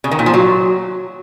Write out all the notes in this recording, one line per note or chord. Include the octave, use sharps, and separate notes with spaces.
C#3
D#3
A#2
F3
F#3